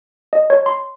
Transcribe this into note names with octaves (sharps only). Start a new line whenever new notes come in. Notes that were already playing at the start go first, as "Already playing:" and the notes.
D#5
C#5
C6